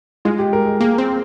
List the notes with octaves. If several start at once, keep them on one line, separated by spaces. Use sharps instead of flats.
G#3 F4
G4
A#4
G#4
A#3 G#4
C4